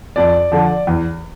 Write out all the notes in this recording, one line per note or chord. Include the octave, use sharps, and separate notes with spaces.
F2 D5
D3 F3
E2